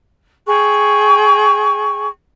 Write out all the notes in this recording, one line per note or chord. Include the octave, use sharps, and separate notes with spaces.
G#4 G5 C#6